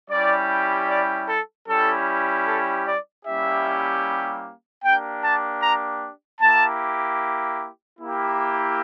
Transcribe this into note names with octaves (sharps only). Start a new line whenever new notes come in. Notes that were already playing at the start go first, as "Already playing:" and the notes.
G3 C#4 E4 G4 D5
D5
A4
G3 C#4 E4 G4 A4
A4
D5
G3 A#3 C#4 E4 G4 E5
A#3 D4 G4 G5
A5
A#5
A#3 E4 G4 A5
A#3 E4 G4